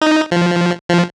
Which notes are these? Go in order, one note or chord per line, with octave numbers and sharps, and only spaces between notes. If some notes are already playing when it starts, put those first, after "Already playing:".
D#4
F3
F3